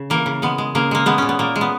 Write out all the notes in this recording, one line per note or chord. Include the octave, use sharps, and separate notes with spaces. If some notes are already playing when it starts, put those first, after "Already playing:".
Already playing: C#3
E3 A#3
C#3
G#3 B3
G#3
C#3 A#3
G#3 A#3
G#3 B3
A#2 C#4
B3
A#2 A#3
G#3
B3